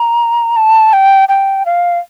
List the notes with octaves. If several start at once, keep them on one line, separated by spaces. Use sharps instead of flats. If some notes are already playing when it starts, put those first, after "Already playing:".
Already playing: A#5
A5
G5
G5
F5